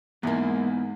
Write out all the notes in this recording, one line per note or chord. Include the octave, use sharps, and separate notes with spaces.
E2 G#2 G#3 A#3 B3 E4 G#5